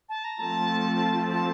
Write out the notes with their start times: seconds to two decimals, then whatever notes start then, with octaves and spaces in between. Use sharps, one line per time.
0.09 A5
0.24 A#5
0.40 F3 A3 C4 A5
1.29 A5